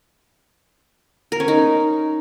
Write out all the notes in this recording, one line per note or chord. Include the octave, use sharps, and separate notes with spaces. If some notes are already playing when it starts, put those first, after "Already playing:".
A#4
C#4
D#4